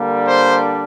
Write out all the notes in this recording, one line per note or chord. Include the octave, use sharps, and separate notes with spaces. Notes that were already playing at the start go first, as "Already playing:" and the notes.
Already playing: D3 G3 A#3 D4
C5